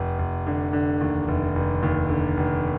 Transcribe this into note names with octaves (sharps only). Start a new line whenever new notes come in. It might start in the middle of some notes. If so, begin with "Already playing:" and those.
Already playing: F1
F1
D3
D3
D#2
F1
F1
D#2
D3
F1